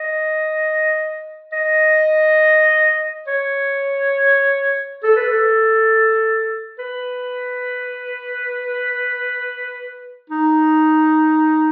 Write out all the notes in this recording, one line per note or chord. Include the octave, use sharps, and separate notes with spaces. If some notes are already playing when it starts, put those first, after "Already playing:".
Already playing: D#5
D#5
C#5
A4
B4
A4
B4
D#4